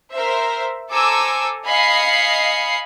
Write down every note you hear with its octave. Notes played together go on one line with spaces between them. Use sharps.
A#4 C5 E5
A4 C5 G#5 A#5 D6 E6
D#5 F5 G#5 B5 C7 C#7